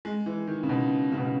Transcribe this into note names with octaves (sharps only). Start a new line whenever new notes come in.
G#3
E3
D#3
C#3
B2
C#3
B2
C#3